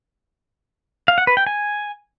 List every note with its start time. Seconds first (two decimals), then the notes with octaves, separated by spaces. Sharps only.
1.08 F5
1.18 F#5
1.27 B4
1.37 G5
1.47 G#5